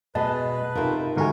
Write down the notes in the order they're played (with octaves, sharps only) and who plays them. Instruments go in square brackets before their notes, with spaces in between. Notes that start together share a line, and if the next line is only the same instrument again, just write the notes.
[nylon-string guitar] B2 G#3 [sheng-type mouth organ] B4 [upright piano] D#5 [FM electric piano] A5
[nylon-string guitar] C3 A#4 [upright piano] A3 D#4 F4
[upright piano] G1 A3 G#5 [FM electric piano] G#2 D#3 F#4 [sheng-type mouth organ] A#4